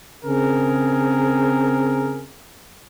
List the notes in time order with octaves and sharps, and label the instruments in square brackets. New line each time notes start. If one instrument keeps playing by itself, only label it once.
[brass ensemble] C#3 C4 G#4 A#4